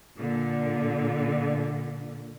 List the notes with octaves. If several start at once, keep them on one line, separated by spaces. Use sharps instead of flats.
A#2 D3